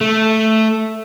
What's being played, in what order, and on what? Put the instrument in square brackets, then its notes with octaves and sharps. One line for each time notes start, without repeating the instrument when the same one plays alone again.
[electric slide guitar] A3